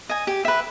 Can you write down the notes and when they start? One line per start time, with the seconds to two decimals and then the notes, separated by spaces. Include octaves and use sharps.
0.09 D#5 G#5
0.27 G4
0.45 B4 E5